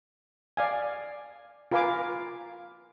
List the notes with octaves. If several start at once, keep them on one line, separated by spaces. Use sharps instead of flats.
D5 F5 G#5
F4 A#4 B4 F5 G#5 D6